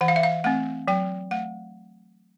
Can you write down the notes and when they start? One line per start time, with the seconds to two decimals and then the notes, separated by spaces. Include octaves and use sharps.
0.01 E3 F#5
0.08 F5
0.16 E5
0.23 F5
0.44 A3 C4 F#5
0.88 F#3 G5
1.31 A3 F#5